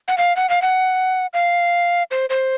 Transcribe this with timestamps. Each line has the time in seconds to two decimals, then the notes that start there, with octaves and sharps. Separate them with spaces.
0.08 F#5
0.18 F5
0.37 F#5
0.49 F5
0.62 F#5
1.34 F5
2.11 C5
2.30 C5